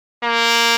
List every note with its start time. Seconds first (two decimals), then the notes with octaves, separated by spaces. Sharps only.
0.23 A#3